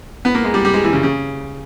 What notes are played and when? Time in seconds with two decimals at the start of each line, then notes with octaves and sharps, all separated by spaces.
0.25 B3
0.35 A#3
0.44 G#3
0.54 G3
0.65 G3
0.74 G#3
0.84 E3
0.93 C#3
1.03 C#3